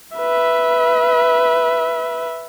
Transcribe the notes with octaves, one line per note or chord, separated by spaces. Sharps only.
B4 E5